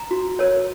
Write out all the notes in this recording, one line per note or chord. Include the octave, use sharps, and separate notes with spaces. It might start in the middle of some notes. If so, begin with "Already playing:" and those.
Already playing: A#5
F#4
A#4 C#5